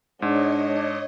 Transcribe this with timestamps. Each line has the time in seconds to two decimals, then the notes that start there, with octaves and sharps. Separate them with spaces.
0.22 G#2 G#3 D4 C#5 D#5